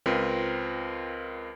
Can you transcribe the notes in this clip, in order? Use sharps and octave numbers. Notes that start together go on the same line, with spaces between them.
C#2 C4 F4 A#4 B4